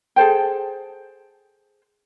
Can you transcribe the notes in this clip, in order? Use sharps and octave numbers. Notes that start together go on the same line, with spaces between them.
G#4 A4 C5 G5